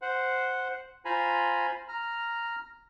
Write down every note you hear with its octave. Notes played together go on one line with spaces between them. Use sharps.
C5 F#5
F4 C5 G#5 A#5 B5
A#5 F6